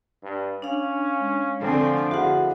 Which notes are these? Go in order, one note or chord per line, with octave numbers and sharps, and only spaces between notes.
G2
C#4 D4 F5
G#3
D3 F3 A3 C4 A4 G#5
D3 E4 F#4 G#4 F5 F#5